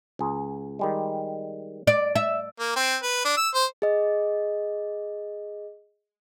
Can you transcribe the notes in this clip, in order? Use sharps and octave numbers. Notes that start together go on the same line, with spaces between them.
C#2 G#4
D#3 G3 G#3
D5
E5
A#3
C4
B4
D4
E6
C5
G#4 D#5